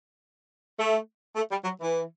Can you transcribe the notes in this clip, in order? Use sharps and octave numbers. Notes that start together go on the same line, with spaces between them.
A3
A3
G3
F#3
E3